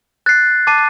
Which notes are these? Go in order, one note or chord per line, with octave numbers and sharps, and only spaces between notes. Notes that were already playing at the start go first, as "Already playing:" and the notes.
F#6 A6 C7
A5 D6 A6 C7 D#7